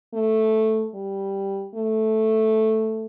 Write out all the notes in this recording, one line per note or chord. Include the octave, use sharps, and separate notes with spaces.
A3
G3
A3